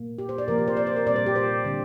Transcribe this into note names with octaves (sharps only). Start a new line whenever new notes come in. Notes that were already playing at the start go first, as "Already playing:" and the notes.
Already playing: A#2 A#3
G4
C5
D5
C3 F3 A#3 A#4
G4
C5
D5
C5
A#4
A#2 G3 C4 D5
C5
G4
C5
D3 G3 C4